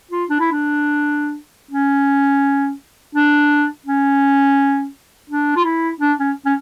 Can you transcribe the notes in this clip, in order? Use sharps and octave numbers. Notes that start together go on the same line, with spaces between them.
F4
D4
E4
D4
C#4
D4
C#4
D4
F4
E4
D4
C#4
C#4